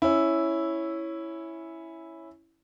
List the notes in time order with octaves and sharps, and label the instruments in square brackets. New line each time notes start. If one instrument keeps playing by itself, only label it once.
[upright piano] C#4 E4